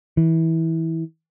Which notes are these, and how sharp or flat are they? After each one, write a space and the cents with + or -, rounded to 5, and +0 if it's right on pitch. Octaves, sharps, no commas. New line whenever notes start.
E3 -20